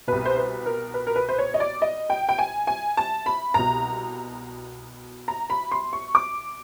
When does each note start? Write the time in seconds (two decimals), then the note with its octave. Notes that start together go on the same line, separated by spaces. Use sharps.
0.07 C2 B2 B4
0.25 C5
0.37 B4
0.66 A#4
0.94 B4
1.07 A#4
1.16 B4
1.29 C5
1.38 C#5
1.54 D#5
1.60 D5
1.82 D#5
2.10 G5
2.29 G5
2.38 G#5
2.67 G#5
2.97 A5
3.26 B5
3.54 C2 B2 A#5
5.28 A#5
5.50 B5
5.71 C6
5.93 C#6
6.15 D6